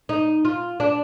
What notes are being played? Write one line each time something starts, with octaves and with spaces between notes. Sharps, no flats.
D#4
F4
D4